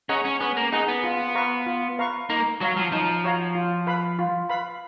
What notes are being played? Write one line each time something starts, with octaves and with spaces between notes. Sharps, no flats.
C#4 G#4 D#5 F#5 A#5
C#4
B3 C#4
A#3
D#4 G#4 D#5 F#5 A#5
B3
F4
B4 F5 A#5 C#6
F4
B4 F5 A#5 C#6
A#3 D#4
F#3 F#4 C#5 F5 A#5
F3
F3 D#4
F#4 C#5 F5 A#5
F4
B4 F5 B5
F4
B4 F5 B5